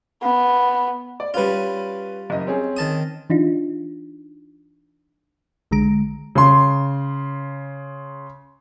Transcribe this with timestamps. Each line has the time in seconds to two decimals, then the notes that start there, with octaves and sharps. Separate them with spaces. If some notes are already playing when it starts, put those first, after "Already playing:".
0.22 B3
1.20 D5
1.34 G3 C#4 F4 B4
2.30 F#1 D#5
2.47 C4 C#4 G#4
2.77 D#3 A5 D#6
3.30 E3 D4 D#4 F4
5.71 B1 D3 G#3 A#5 D7
6.35 C#3 C6